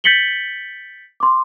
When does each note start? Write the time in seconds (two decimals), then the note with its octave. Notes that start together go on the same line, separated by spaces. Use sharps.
0.04 G6 A6 B6 C#7 F#7 G7
1.20 C6 D6